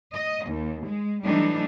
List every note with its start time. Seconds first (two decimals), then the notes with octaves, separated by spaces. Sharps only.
0.14 D#5
0.48 D#2
0.86 G#3
1.24 E3 F#3 G3 A3 D4 D#4